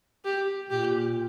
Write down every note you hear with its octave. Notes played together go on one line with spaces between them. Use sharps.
G4
A#2 G4